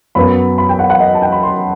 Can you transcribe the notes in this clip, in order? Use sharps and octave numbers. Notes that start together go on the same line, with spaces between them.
F#2 F#3 B3 B5
B5
G5
F#5
F#5
D#5
A5
G5
B5
C6